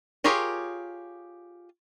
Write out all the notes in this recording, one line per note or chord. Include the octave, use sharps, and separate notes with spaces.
F4 G4 G#4 A#4 C#5